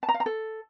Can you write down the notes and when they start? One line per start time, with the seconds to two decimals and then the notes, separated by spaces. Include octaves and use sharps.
0.03 A5
0.09 A#5
0.14 F5
0.20 A#5
0.26 A4